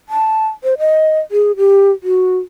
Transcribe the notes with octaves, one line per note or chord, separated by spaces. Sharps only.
A5
C5
D#5
G#4
G4
F#4